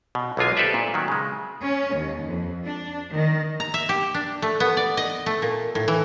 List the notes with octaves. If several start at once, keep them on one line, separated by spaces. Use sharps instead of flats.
B2
B1 D3 G#3 F4 G#5
G4 A4 B4 C5 D5 E5
A#2
D#3 F#3
C#3 G#3
C#4
D#2
F2
D4
D#3
A#5
E5
G4
D4
A3
B3
D5
D#5
A3
A#2
A2
E3